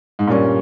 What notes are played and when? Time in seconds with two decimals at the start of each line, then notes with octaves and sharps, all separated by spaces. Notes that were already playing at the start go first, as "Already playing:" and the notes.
0.19 G#2
0.28 G2 A#2 G3 A#3 C#4